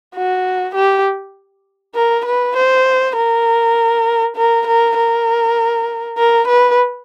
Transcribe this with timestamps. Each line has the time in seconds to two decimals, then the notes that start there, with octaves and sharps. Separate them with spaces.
0.15 F#4
0.75 G4
1.95 A#4
2.26 B4
2.57 C5
3.16 A#4
4.37 A#4
4.67 A#4
4.97 A#4
6.18 A#4
6.48 B4